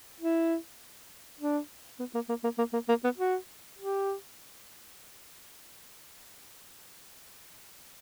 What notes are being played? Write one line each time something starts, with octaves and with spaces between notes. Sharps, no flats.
E4
D4
B3
A#3
A#3
A#3
A#3
A#3
A#3
B3
F#4
G4